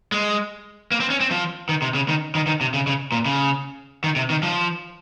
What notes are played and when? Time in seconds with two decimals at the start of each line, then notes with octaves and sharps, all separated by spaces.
0.12 G#3
0.92 A#3
1.00 C4
1.10 C#4
1.20 C4
1.31 F3
1.69 D#3
1.82 C3
1.95 C#3
2.09 D#3
2.35 D#3
2.47 D#3
2.61 C3
2.74 C#3
2.87 C#3
3.12 A#2
3.26 C#3
4.04 D#3
4.16 C3
4.30 D#3
4.43 F3